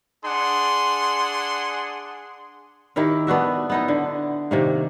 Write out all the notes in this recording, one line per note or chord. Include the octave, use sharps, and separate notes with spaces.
D4 G#4 F#5 C6
D#3 E4 G4 A#4
B3 D4 F#4 E5
B3 D#4 E4
D3
C3 D#3 A#3